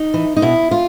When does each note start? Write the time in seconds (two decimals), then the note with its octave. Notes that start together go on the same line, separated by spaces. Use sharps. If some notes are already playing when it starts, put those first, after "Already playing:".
Already playing: D#4
0.14 E3
0.36 D#4
0.42 B2 E4
0.71 F4